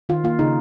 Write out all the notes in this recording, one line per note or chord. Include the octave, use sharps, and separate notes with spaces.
D#3 F4
A#3 F4
C#3 D#4